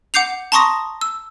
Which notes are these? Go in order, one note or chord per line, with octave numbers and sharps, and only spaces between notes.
F#5 D6 G6 C7 F7
A5 A#5 C6 C#6 D#6 A#6
E6